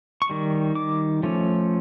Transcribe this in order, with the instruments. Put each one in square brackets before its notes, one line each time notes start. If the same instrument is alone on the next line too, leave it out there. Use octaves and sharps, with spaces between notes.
[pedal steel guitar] C#6
D#3 G3
D6
F3 A3 C#4